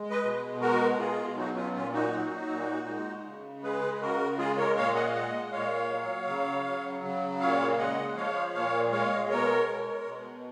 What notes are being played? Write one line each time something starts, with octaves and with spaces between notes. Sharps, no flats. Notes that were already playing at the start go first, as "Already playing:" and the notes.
Already playing: G#3
B4 D#5
B2
G#3 F#4 A#4
B2 F4 G#4
F#3 D#4 F#4
C#4 F4
A#2 C#4 F4
D#4 F#4
F#3
A#2
G#3
C#3
G#3 G#4 B4
C#3 F#4 A#4
G#3 F4 G#4
A#4 C#5
A#2 C#5 F5
D#5 F#5
F5
G#3 D#5 F#5
A#2 C#5 F5
F#3
C#3
F#3
C#3
A#2 C#5 F5
G#3 D#5 F#5
F3 C#5 F5
A#2 C#5 F5
G#3 C#5 F5
B2 A#4 C#5
G#3
B2